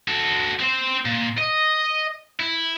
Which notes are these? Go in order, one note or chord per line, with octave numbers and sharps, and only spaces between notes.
F#4 A4
C4 C5
A#2
D#5
E4